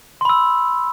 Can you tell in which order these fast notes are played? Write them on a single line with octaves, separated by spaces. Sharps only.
C6 B5 E6